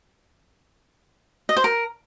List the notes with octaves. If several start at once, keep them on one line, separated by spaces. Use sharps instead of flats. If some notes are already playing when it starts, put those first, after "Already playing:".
D#5
C5
A#4